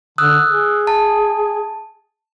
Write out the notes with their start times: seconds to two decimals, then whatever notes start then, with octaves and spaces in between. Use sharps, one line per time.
0.18 D3 D#6 E6 F#6
0.48 G#4
0.87 A5